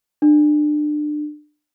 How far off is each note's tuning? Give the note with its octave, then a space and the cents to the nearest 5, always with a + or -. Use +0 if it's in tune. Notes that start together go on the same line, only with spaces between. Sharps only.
D4 +30